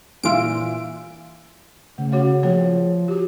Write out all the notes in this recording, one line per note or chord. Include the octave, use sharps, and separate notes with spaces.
A#2 E3 F4 E6 D7
C#3 A3
F#4 C#5 F#5
F3 A#3 G#4 C#5
F#4 G4